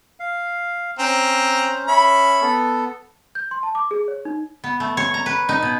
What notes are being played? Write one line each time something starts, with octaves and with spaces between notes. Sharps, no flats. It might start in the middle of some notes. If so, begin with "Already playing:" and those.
F5
C4 C#4 C5 A#5
C#4 C#5 E5 B5
B3 A4
G6
C6
A5
D6
G#4
C#5
D#4
B3
A3
C#5
A#5
B4
D#4
B2